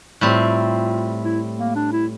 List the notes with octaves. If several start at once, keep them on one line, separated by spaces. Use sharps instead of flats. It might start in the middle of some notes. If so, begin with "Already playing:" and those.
A2 G3 C4 F4
E4
A#3
D4
E4